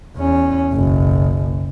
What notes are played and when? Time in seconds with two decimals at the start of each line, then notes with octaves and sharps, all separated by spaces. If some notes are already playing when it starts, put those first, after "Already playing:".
0.17 E2 C#4
0.71 F#1 B1